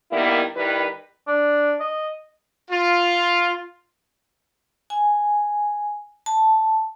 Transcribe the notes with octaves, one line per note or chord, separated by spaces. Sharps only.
D#3 G3 A#3 B3 E4
D#3 G3 E4 B4
D4
D#5
F4
G#5
A5